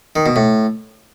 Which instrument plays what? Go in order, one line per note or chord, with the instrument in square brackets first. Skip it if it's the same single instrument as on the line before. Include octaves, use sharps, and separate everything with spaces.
[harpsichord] D#3
B2
A2